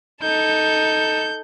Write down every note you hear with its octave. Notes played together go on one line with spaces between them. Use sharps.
D#4 A4 G6